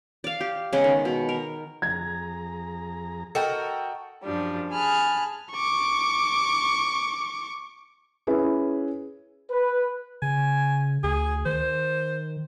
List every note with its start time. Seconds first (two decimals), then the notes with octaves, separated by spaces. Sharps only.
0.24 D5 F5
0.40 G4
0.73 C#3 G#3 B3
0.84 D#3
1.05 B2
1.29 A#4
1.82 F2 G#4 A#5 G#6
3.35 F#4 A4 A#4 D#5 G5
4.23 F#2 F3 G3 D4
4.72 G#4 G#5 A5 B5 F6 F#6
5.52 C#6 D6
8.27 C#4 E4 G#4 B4
9.50 B4
10.22 C#3 G#5
11.04 D2 G#4
11.46 D#3 C5